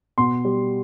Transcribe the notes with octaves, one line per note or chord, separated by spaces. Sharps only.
B2 C6
G3